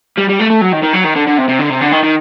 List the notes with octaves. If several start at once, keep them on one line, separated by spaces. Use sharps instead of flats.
G3
G3
A3
A3
F#3
D#3
D#3
F#3
D#3
D3
D3
C3
C3
D3
C3
D3
D#3
D#3